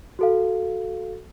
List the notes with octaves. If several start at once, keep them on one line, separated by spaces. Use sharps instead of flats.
F#4 A4 F5